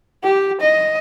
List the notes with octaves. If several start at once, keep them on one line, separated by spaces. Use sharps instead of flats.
G4
D#5